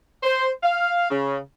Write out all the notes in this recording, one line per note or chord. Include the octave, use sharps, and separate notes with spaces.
C5
F5
C#3